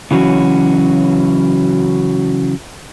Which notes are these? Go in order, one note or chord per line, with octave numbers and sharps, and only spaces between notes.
C#3 E3 F#3 C#4 F#4